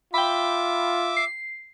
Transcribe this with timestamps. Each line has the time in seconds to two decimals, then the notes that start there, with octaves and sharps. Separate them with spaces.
0.14 F4 E5 G5 B5 D6
1.17 C7